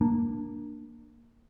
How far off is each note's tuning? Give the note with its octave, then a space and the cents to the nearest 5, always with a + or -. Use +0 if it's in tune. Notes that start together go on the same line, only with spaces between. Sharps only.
A#3 +0 D4 +10